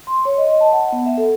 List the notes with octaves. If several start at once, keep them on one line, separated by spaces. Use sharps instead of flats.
C6
C#5
D#5
D#5
A5
F#5
B3
E5
A4